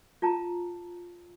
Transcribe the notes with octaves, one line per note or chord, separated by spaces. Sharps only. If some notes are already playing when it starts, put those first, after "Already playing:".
F4 G5 A5 A#5